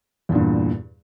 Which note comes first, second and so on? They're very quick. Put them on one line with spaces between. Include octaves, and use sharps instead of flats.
E2 A#2 G2